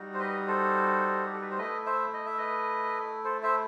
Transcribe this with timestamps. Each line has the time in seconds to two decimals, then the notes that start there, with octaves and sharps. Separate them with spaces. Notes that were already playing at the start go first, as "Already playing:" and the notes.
Already playing: G3 D#4 F#4
0.14 C5
0.20 B4 D#5
0.47 A4 C5
1.25 G4
1.33 A4
1.41 B4
1.51 C5
1.58 A3 E4 B4 D#5
1.86 C5 E5
2.13 D#5
2.26 E5
2.38 B4 D#5
3.24 A4 C5
3.43 C5 E5